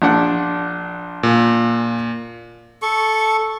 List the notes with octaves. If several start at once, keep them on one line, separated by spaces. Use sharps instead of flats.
A#1 D4 F#5
A#2
A4 C#6